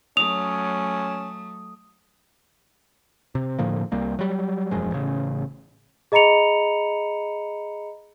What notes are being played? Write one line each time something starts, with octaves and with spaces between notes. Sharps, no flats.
F#3 A3 C#4 D#6 F7
C3
A2 D3 F3 A#3
C2 G3 A#3
F#3 G3
E1 F#2 F3 G#3
A1 C#3
G#4 D#5 A#5 B5 C#7 F7